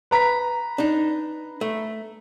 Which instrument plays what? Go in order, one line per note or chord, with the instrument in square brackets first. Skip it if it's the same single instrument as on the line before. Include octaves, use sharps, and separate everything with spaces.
[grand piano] B4 A#5 B6
[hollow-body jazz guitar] D4 D#4
A3